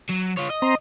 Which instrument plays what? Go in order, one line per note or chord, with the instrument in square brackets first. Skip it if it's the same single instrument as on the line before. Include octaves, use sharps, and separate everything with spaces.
[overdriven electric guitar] F#3
F4 C#5
D#5
[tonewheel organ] C4 A#5 C6